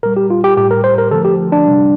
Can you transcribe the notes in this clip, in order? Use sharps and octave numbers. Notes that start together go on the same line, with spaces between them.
A#2 G3 A#4
G4
F4
G4
A2 G3 G4
A#4
C5
A#4
D3 F3 A3 A4
G4
D4
C3 G3